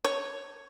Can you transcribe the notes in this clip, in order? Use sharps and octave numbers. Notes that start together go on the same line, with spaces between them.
C#5